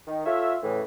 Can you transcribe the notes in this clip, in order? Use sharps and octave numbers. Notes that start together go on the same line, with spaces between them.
D#3
F4 A4 C#5 E5
A2 C#3 E3